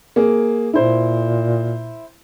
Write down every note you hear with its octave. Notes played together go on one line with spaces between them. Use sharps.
A#3 G#4
A#2 E4 C5